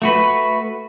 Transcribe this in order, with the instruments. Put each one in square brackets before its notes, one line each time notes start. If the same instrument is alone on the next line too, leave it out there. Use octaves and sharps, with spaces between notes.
[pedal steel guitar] A3 F#4 B4